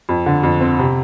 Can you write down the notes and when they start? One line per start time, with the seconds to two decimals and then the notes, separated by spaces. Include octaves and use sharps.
0.09 F2
0.26 D3
0.43 F2
0.61 C4
0.79 C3